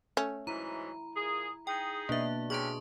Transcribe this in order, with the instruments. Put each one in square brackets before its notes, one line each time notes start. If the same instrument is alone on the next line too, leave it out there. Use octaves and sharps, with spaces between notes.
[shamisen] A3 C#4
[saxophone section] G#2 E3 F#3 [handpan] E4 [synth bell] A#5
[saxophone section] A#2 G#4
[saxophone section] D#4 G#4 [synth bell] G5
[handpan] B2 D4 B4 [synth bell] A#3 E5
[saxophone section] C3 C#4 [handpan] G#4 [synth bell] A5 C6 C#6